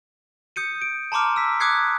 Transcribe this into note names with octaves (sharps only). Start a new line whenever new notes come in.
D#6 G6 C#7 D#7
D7
A5 A#5 C6 D6 F6
E6 B6
D6 D#6 F#6 G#6 C7 C#7